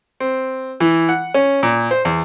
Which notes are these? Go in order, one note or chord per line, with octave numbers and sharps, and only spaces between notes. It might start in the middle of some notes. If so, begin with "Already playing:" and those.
C4
E3
F#5
C#4
A#2
C5
E2